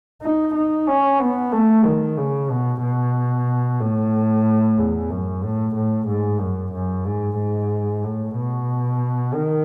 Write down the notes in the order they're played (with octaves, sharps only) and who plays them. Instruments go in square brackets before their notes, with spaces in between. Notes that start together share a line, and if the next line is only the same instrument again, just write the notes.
[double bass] D#4
D#4
C#4
B3
A3
D#3
C#3
B2
B2
A2
E2
F#2
A2
A2
G#2
F#2
F#2
G#2
G#2
A2
B2
D#3